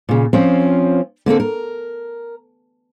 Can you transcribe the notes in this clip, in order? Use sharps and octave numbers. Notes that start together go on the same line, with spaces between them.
A#2 C#3
F3 C4 C#4 F4
D3 A#3 C4 A4
A#4